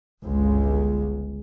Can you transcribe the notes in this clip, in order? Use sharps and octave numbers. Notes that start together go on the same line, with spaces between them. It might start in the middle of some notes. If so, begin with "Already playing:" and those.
G1 C#2 G#3